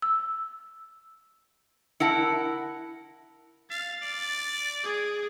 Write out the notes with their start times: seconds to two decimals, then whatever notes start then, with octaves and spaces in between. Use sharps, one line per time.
0.02 E6
2.00 E4 A#4 F#5 A5 A#6 C#7
3.70 F5 A6
4.03 D5
4.84 G#4